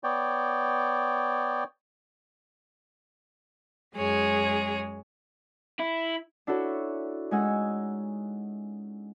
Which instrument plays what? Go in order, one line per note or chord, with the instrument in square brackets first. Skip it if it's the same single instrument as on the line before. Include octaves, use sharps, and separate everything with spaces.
[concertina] B3 C#5 D5 G5
[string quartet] F#2 G#3 G#4 C#5
[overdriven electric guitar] E4
[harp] D4 E4 F#4 A4 C#5
G#3 C#4 D#4 F#5 G#5 E6